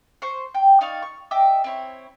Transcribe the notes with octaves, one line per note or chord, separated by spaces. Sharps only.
C5 C#6
G5
D#4 D5 F5 C#6
C#6
D#5 E5 G5 D6
C4 E4 C#5